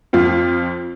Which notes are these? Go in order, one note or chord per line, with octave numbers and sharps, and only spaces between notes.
F2 F3 F4